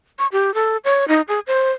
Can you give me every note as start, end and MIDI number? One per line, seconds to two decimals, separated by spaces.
0.19 0.27 85
0.32 0.54 67
0.54 0.77 69
0.85 1.08 73
1.08 1.21 63
1.28 1.40 68
1.47 1.71 72